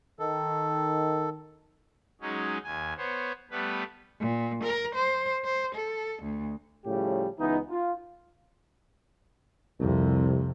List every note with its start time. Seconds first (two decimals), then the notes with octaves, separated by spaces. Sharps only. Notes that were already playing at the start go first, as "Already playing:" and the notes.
0.19 D#3 A4
2.21 F#3 G#3 C#4 D#4
2.64 D#2 G#5
2.97 B3 C5 C#5
3.51 G3 A3 B3 B4
4.20 A#2
4.63 A#4
4.95 C5
5.45 C5
5.74 A4
6.22 D2
6.85 A2 C#3 F3 G3 G4
7.38 C#2 E3 B3 D#4
7.69 F4
9.80 C2 F2 C3